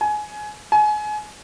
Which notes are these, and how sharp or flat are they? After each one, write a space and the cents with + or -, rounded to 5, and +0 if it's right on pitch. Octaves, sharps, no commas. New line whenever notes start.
G#5 +20
G#5 +30